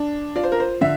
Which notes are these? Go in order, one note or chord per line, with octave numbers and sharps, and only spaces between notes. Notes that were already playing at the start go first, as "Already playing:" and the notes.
Already playing: D4
F4 D5
C5
A#4
C5
D3 E5